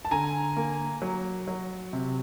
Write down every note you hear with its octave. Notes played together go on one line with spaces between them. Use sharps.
A5
D3 G#5 A#5
A#3
F#3
F#3
C3